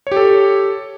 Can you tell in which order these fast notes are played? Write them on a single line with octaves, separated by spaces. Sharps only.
C#5 G4 A4